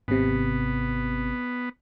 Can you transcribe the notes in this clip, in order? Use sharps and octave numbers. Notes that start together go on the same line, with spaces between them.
G#1 C3 B3